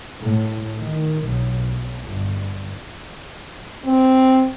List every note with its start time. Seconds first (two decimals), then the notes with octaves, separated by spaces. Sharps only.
0.19 A2
0.78 D#3
1.24 B1
2.04 G1
3.85 C4